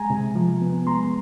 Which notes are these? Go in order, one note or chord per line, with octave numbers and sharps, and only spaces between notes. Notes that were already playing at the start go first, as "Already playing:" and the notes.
Already playing: G#3 G#5 A#5
C3
F3
B3
G#3 A#5 C6